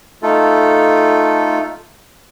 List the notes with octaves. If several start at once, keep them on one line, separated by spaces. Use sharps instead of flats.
A3 D#4 F4 A4